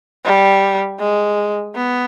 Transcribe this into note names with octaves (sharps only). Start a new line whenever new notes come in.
G3
G#3
B3